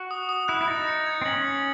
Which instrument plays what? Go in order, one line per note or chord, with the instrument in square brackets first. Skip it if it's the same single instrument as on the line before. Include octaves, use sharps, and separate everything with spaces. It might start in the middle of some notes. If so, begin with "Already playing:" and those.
Already playing: [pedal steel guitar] F#4
[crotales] D#6
D#6
[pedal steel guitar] E4 [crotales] F#6
[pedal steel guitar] E4
[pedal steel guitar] D#4 [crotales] A6
[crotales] C#7
G#6
[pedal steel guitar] C4
[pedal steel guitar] C#4 [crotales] F#7
[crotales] F#7